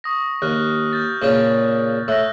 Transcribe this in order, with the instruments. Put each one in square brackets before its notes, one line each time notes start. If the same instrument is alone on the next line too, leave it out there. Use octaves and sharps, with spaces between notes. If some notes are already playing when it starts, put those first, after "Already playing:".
[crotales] C#6 D#6 A#6
[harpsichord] D#2 [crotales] F6 F#6
[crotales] F6 G6 A6
[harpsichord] A#2 C#3 C#4
[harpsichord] A2 [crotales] E6 F#6 A#6